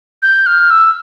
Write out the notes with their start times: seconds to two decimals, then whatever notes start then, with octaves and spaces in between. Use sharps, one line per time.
0.22 G6
0.46 F6
0.70 E6